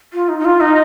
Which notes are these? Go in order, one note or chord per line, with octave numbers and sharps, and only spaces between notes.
F4
D#4
D#4
F4
D#4